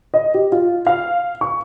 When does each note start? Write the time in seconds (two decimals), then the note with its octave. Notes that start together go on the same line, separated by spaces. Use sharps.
0.14 D#5
0.34 G4
0.52 F4
0.87 F5
1.41 C#6